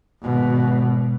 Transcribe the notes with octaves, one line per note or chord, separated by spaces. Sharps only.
G#1 B2